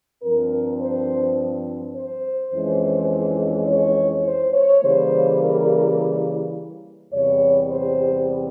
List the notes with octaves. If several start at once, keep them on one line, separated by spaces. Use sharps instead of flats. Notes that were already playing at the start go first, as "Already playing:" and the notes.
G2 F3 C4 A#4
C5
C5
F2 E3 G#3 C#4
C#5
C5
C#5
C#3 E3 G3 A#3 C5
A#4
E2 C3 G3 C#5
C5